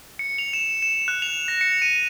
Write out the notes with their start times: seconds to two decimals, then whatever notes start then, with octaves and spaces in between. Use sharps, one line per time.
0.19 C#7
0.38 F7
0.53 E7
0.82 E7
1.08 F#6
1.22 F7
1.48 A#6
1.61 C#7
1.82 D#7